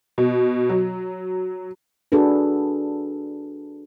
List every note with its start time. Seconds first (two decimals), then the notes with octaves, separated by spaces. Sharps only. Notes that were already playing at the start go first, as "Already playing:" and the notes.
0.18 B2
0.69 F#3
2.12 D4 F#4 G#4 A4 B4